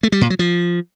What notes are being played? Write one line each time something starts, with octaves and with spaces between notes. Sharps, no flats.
A3
G3
A#2
F#3
F3